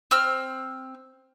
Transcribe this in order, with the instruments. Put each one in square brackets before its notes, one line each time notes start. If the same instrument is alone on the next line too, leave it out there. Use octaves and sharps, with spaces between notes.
[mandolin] C4 E6 F6